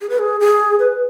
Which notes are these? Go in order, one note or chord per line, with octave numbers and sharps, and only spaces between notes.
G#4
B4
G#4
G#4
B4